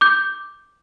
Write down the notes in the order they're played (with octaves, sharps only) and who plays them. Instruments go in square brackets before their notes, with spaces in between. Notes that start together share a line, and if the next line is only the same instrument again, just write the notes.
[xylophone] D6 G6